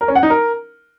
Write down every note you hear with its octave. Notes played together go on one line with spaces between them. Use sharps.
A#4
C#4
F#5
D#4
A#4